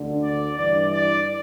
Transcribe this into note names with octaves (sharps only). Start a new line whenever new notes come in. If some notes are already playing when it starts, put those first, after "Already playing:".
Already playing: D2 D3
D5
G2 E3 D5
D5